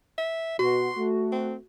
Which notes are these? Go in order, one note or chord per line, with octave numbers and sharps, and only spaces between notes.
E5
B2 F#4 C6
A3
C4